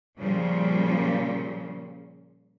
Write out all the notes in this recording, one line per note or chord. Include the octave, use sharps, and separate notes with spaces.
A#2 C#3 F3 G3